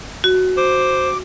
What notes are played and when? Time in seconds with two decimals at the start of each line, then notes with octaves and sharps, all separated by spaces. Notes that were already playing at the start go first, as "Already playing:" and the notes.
0.24 F#4
0.57 C5 D6